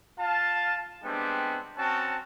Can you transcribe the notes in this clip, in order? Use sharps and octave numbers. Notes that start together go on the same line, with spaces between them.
F4 F5 A5
G3 G#3 B3 C4 D4
C4 C#4 F#4 A5